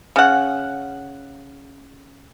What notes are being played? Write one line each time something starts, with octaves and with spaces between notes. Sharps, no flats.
C#3 F#5